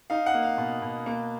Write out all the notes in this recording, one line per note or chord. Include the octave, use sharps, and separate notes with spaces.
D#4 F5
F#5
A#3
F5
B2
B2
A#3